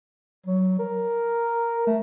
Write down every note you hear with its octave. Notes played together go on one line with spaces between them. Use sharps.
F#3
A#4
A3